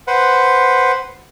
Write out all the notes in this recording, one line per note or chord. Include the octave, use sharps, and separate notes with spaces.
B4 C5 F#5